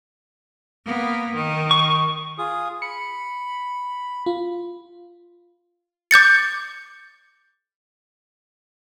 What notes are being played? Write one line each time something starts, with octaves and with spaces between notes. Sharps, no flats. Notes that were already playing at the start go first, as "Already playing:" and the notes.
A#3 B3
D#3
C#6
F4 G#4 D#6
B5 C#7
F4
D6 G6 A6 C#7